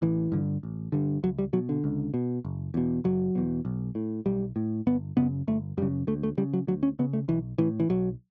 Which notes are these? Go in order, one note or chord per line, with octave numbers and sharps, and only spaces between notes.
A1 E3
G2 D3
A1
G2 D3
C#2 F#3
G3
B2 F#3
D3
C#2
B2
F#1
E2 B2
F#1 F#3
E2 B2
B1
A2
B1 G3
A2
G1 B3
F#2 C#3 B3
G1 A3
F#2 C#3 G3
D2 A3
A3
C#3 G3
F#3
D2 F#3
C#4
C#3 B3
A3
B1 E3
A2 E3
E3
B1 F#3